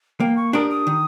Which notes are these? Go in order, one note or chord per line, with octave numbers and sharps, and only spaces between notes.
A#3 G5
C#6
D4 G4 A#4 D#6
D#6
D#3